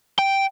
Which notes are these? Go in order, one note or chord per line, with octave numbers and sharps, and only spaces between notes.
G5